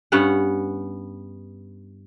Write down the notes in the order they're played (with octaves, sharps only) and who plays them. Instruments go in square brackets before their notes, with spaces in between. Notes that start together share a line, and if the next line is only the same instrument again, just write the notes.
[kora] G2 B3 C#4 F#5